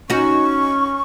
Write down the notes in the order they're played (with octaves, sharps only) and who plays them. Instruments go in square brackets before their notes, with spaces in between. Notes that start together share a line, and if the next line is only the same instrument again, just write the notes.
[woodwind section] C#4 [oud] D#4 F#4 [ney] C#6